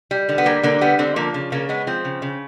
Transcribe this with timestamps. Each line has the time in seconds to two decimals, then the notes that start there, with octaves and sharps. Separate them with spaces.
0.11 G3
0.29 D3
0.38 B3
0.46 G3 A#3
0.63 D3 A#3
0.81 G3 B3
0.99 D3 C4
1.16 F3 A#3
1.34 C#3
1.52 C#3 A#3
1.69 G#3 B3
1.87 F3 C4
2.05 C#3
2.22 C#3